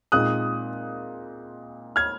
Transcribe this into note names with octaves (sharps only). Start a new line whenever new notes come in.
A#2 G#3 C4 D#4 D#6 F#6
F6 G#6